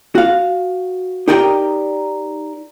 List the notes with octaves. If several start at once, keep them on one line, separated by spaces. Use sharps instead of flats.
F#4 F5
D#4 G4 A#4 D5 D#5 G5